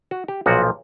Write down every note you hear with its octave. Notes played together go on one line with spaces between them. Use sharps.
F#4
G4
B1 A#2 F3 F#4